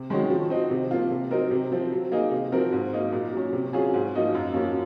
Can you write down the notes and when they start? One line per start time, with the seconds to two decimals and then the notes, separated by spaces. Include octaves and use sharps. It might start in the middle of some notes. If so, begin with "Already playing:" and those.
Already playing: C3
0.10 D#3 G#3 C#4 F#4
0.30 F3
0.50 C4 D#4 F#4
0.71 C3
0.91 F3 A#3 F4
1.11 C3
1.31 F#3 C4 D#4 A#4
1.51 C3
1.72 F3 C4
1.92 F#3
2.12 A#3 D#4 G#4
2.31 C3
2.52 F3 C4 F#4 A#4
2.72 G#2
2.93 F#3 A#3 D#4
3.12 A#2
3.33 F#3 C#4
3.53 C3
3.73 F#3 C#4 F4 G#4
3.94 G#2
4.14 F3 A#3 D#4 F#4
4.34 F#2
4.54 F3 A#3 C#4 F#4